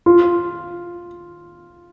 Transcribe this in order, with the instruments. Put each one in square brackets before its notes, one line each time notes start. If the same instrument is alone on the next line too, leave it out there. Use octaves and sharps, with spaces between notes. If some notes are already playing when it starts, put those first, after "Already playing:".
[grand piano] F4